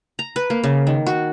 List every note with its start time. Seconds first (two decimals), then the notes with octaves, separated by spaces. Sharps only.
0.19 A#5
0.36 B4
0.50 A#3
0.64 C#3
0.87 D#3
1.07 F#4